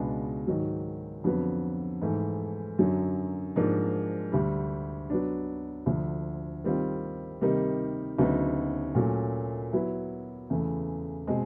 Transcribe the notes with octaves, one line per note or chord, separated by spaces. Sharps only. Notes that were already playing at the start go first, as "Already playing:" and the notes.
Already playing: C#2 B2 G#3 B3 D4
G#2 D#3 F#3
F2 D3 F#3 B3
G#2 E3 A3
F#2 D3 F#3
G#2 F3 A#3 D4
D2 D3 G3
F#3 B3 D4
D2 D3 F3
D#3 G3 C4 F4
C3 D#3 G3 A#3 D#4
D2 C#3 F#3 B3 D#4
A#2 F#3 A3 C#4
F#3 B3 E4
E2 C#3 E3 A3
B2 G#3 C4